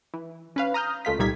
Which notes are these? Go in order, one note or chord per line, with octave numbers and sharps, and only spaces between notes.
E3
C#4 B4 F5
A#5 D#6 F6 G6
C#2 A3 F4 B6
C2 A#2 G3 D#4 G#6 B6